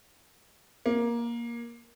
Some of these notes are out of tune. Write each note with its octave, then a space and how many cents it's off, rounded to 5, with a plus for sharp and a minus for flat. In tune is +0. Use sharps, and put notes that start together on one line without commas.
A#3 +15